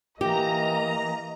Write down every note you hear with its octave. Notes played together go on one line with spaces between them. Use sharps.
E3 A#3 G4 D#5 A#5